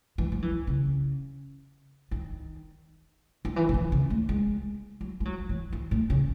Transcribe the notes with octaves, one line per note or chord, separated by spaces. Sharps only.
E3
F#3
E3
C#3
D#3
D#3
E3
C#3
D#3
C#3
A3
G#3
F#3
G#3
F#3
E3
E3
A2
C#3